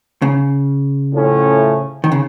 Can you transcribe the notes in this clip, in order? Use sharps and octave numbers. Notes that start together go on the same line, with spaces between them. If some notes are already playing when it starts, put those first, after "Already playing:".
C#3
A2 F3 A3 C#4
D#3
C#3